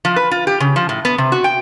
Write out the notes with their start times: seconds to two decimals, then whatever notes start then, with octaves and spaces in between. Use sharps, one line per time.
0.05 F3
0.16 B4
0.31 F4
0.47 G4
0.60 C#3
0.76 F3
0.89 A2
1.05 B3
1.18 C3
1.32 F#4
1.44 G5